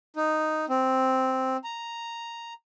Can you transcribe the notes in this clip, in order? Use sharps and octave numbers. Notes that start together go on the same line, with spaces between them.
D#4
C4
A#5